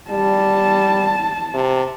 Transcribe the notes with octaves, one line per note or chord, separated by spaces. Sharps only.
G3 A5
C3